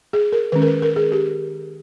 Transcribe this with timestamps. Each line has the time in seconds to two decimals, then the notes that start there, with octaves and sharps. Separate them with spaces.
0.13 G#4
0.32 A#4
0.52 D#3 G#3 C#4 B4
0.62 A#4
0.67 B4
0.82 A#4
0.96 G#4
1.12 G4